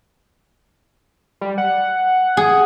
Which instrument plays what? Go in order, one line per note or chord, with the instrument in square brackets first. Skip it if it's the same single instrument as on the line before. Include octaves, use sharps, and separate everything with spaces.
[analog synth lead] G3
F#5
[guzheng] G#4